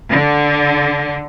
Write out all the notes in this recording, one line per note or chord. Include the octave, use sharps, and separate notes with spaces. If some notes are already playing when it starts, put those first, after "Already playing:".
D3